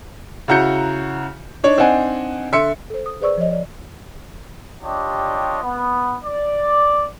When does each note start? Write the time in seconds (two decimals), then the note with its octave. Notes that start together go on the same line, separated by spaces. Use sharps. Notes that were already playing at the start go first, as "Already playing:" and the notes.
0.48 C#3 E4 F#4 A#5 G6 C#7
1.64 D4 D#4 C#5
1.78 C4 D4 D#4 F#5 G#5
2.52 D3 E5 C6 C#7
2.90 A4 C5
3.06 D#6
3.21 G#4 B4 C5 D5 C#6 E6
3.38 F3 C#5 D#5
3.51 D5
4.83 G3 D4 F4 G4 C#5 D#5
5.63 B3
6.25 D5